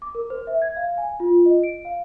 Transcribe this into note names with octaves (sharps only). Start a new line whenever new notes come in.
D6
A#4
C5
E5
G#6
F5
G#5
F4
D#5
D7
F5